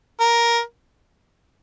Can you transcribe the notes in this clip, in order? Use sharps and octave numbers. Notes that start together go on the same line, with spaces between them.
A#4